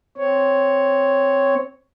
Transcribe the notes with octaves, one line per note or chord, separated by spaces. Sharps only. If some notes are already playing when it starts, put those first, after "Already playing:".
C4 C#5